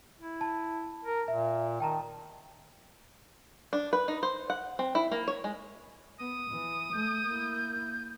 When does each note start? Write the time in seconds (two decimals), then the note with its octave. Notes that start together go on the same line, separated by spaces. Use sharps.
0.20 E4
0.41 A5
1.05 A#4
1.28 A#2 E5
1.80 D#3 G5 A5 A#5
3.73 D4
3.93 B4
4.08 D#4
4.23 C5
4.50 F#5
4.79 C4
4.95 E4
5.12 A#3
5.28 C#5
5.44 G#3
6.20 B3 D#6
6.51 E3
6.93 A3 G6
7.27 A#3 E4